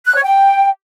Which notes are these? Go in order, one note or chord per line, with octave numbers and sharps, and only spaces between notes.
F#6
C#5
G5